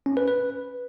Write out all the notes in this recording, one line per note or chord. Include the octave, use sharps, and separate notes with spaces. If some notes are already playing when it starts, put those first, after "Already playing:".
C#4
B4
B4